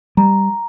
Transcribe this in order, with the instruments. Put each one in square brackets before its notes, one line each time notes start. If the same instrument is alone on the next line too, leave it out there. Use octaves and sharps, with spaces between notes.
[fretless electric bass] G3 [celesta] A#5